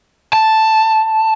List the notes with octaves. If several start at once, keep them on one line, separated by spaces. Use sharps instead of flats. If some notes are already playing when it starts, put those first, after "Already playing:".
A5